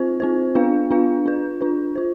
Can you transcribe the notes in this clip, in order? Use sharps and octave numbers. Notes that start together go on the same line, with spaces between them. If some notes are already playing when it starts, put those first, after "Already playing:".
Already playing: C4 F4 C5
C4 F4 C5
B3 D4 F4 B4 F5
B3 D4 F4 B4 F5
D4 F4 B4
D4 F4 B4
F4 C5